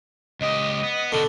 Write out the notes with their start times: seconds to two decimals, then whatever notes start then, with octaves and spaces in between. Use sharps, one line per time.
0.41 C#2 G4 D#5
0.83 B3
1.12 B2 D3 D#3